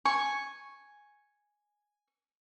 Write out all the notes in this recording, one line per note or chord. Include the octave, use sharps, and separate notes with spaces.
G#5 C#6